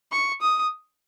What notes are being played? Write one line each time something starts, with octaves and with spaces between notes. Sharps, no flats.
C#6
D#6